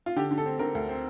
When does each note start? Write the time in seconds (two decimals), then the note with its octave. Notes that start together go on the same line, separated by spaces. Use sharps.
0.06 F4
0.16 D3 G4
0.31 D3
0.38 A4
0.46 C4
0.59 D3 A#4
0.75 D2
0.89 C4